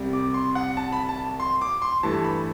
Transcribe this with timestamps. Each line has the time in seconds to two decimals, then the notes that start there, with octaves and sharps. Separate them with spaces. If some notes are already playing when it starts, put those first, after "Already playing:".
Already playing: C2 C3 G3
0.13 D6
0.34 C6
0.55 F#5
0.77 A5
0.92 B5
1.09 A5
1.40 C6
1.61 D6
1.82 C6
2.03 G2 E3 A3 A5
2.24 B5